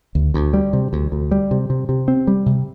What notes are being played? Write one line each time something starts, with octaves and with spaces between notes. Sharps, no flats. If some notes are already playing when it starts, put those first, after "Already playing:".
D2
D2
G3
C3
D2
D2
G3
C3
C3
C3
C4
G3
C3